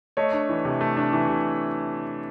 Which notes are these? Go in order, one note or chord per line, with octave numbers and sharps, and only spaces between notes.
A3 C#5 D#5
D4
E3
C3
A3
D4
E3
C3